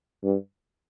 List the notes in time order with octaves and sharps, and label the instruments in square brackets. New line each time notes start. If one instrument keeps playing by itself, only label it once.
[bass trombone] G2